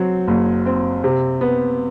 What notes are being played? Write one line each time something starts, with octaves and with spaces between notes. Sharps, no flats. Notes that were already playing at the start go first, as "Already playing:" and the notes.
Already playing: F#3 C4
F#1
C4
C3
B3